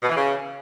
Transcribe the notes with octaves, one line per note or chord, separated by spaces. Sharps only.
B2
E3
C#3